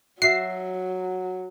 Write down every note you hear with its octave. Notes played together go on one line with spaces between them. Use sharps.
F#3 F#4 E5 C7